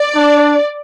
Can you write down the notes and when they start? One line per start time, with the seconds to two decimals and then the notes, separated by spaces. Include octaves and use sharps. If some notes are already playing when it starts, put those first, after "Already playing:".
Already playing: D5
0.15 D4